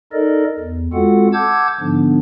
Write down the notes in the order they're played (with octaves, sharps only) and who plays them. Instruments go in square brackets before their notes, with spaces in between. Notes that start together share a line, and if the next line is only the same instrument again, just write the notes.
[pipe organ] D#4 A4 A#4 D5 D#5
E2
G#3 C4 F4 F#4 A4 F#5
F#5 A5 D6 E6 G6 G#6
G#2 D3 F3 B3 D4